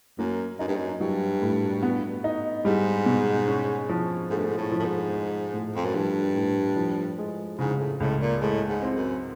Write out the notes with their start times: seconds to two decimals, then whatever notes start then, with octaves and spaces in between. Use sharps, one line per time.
0.19 F#2 A#3
0.59 F#2 D#4
0.68 G2
0.76 F#2
1.00 G2 F#3
1.42 A2
1.83 B3
2.24 D#4
2.65 G#2 G3
3.06 B2
3.48 C#4
3.89 F3
4.30 G#2 A3
4.38 G2
4.45 G#2
4.58 A2
4.72 F3
4.80 A2
4.85 G#2
5.13 G#3
5.53 A2
5.75 F2
5.85 F#2
5.94 G2 F3
6.35 A2
6.77 F3
7.18 G#3
7.59 G#2 C#3
7.80 A2
8.00 C#2 A2
8.21 A#2
8.41 A2 G#3
8.69 G#2
8.82 C4
8.96 F#2